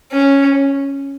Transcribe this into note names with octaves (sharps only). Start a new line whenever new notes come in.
C#4